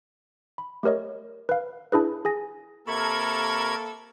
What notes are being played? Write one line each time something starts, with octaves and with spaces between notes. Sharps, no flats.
B5
A3 G4 A#4 C#5 D#5
B4 F5
D4 E4 G#4 B4
G#4 G#5 A#6
C3 A#3 A4 A#4 B5 C#6 G#6